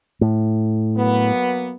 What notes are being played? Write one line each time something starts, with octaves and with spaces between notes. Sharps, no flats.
A2
F#3 A#3 B3